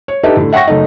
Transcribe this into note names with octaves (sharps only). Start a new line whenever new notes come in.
C#5
D4 D#4 G4 A4 B4 E5
A2 D3
E5 F#5 G5 C#6 A#6
F#1 A3 D#4